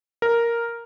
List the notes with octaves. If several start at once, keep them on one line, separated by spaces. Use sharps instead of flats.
A#4